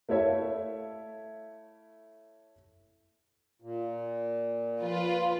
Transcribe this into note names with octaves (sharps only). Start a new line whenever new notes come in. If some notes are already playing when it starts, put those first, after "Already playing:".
A3 E4 A4 C#5 E5 F5
A#2
F3 F4 B4